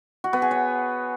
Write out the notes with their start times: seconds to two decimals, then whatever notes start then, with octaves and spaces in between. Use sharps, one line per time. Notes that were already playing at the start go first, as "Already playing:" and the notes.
0.24 F#4
0.33 B3
0.42 G#4
0.51 C#5